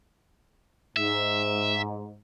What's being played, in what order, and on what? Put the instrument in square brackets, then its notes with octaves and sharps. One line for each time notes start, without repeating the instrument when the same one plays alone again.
[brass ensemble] G#2 [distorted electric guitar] E5